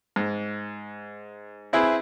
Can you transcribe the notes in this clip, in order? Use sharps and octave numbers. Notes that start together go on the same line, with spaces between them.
G#2
C4 E4 G#4 B4